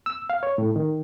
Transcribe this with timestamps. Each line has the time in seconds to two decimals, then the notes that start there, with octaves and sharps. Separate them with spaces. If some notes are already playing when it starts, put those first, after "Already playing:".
0.06 E6
0.30 F5
0.43 C#5
0.58 A2
0.76 D#3